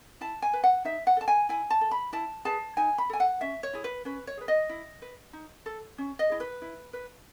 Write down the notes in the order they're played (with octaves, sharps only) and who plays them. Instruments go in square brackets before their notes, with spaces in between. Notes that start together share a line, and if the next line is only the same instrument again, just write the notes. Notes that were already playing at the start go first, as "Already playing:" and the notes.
[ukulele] E4 A5
G#5
B4
F#5
D#4 E5
F#5
A4 A5
G#5
E4 G#5
A5
A4
B5
E4 A5
G#4 B4 A5
D#4 G#5
B5
A4 G#5
F#5
C#4 E5
C#5
E4 G#4
B4
C#4 B4
C#5
G#4 B4
D#5
E4
B4
D#4
A4
C#4
D#5
E4 G#4
B4
E4
B4